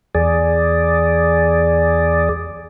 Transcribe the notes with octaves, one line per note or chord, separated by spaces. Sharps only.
E2 G#4 D5